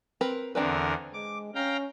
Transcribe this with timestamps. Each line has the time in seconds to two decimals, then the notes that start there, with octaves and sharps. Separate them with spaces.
0.21 C4 A#4 B4
0.55 E2 D3 C4 D4 A#4 B4
1.14 G#3 D6
1.55 C#4 F5 G5 A#5